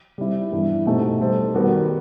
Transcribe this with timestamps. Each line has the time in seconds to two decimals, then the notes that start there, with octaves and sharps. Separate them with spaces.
0.18 G3 C4 E4
0.52 G2 E3 B3 E4
0.86 B2 A3 C4 D#4 G4
1.20 G3 D#4 A4 C5
1.54 D#3 G3 B3 F#4